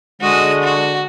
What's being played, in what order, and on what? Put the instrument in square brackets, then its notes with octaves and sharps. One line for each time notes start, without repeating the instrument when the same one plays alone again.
[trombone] D3 [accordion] G#3 [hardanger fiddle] F#4 D#5
[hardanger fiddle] F#4